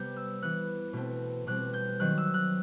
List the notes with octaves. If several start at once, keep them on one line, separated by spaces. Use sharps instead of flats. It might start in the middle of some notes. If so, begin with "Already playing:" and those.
Already playing: C3 G3 B3 G6
E6
E3 B3 F#6
B2 A3 C4
B2 G3 C4 F#6
G6
D#3 F#3 C4 F#6
E6
F#6